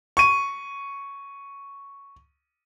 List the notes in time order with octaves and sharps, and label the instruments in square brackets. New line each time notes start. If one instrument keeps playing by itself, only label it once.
[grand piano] C#6 D#7